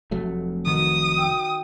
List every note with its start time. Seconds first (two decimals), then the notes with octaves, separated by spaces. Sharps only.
0.11 F1 F#3 A3
0.66 D#3 F#4 B4 D#6
1.18 G5 E6 F6